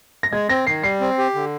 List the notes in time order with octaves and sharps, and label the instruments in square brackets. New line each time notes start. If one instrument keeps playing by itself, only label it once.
[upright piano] A#6
[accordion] G#3 [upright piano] G#6
[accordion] C4 [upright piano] A#6
[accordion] D#3 [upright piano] C7
[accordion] G3 [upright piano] C7
[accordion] C4
G4
D3